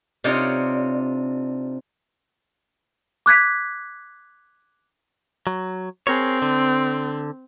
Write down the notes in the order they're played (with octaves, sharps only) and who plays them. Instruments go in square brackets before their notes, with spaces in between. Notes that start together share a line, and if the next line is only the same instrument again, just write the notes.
[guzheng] C3 D4 D#4 F4 C#5 D5
[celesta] D6 F#6 G#6 B6
[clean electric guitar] F#3
[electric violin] C4 [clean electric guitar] G#4 A#4 C#5
[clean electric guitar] D3